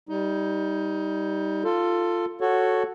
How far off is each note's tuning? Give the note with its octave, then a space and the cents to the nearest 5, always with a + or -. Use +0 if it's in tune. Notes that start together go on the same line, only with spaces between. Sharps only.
G3 +0 D#4 +20
F4 +0 A4 +15
F#4 +0 A4 +0 C#5 -5